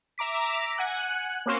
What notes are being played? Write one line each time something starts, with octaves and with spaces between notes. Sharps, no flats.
E5 A#5 D6 B6
F#5 G#5 F#6
A#3 C4 C#4 F#4 C5 F5